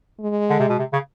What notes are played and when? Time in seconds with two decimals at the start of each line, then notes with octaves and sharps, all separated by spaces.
0.20 G#3
0.50 D3
0.60 C3
0.69 B2
0.79 C3
0.93 C#3